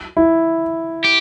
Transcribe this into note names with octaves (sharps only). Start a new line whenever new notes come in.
E4
G4